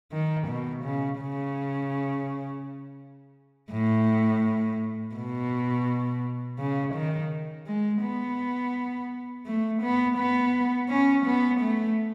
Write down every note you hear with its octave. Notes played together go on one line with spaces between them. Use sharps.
D#3
B2
C#3
C#3
A2
B2
C#3
D#3
G#3
B3
A3
B3
B3
C#4
B3
A3